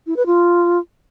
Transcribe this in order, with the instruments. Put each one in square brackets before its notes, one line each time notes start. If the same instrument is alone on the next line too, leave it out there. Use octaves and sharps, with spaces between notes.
[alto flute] E4
B4
F4